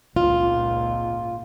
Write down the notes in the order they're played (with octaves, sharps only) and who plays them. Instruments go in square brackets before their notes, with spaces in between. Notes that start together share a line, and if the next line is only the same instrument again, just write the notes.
[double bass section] G#1 C#2 A#2 [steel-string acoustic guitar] F4